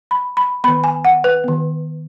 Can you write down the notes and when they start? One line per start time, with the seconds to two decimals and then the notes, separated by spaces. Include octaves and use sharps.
0.11 B5
0.37 B5
0.64 D#3 B3 B5
0.84 G#5
1.05 F#5
1.24 B4
1.44 D#3 B3